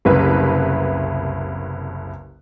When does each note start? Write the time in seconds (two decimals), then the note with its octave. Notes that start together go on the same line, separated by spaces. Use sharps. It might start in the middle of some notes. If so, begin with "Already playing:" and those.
0.05 F#1 C2 B4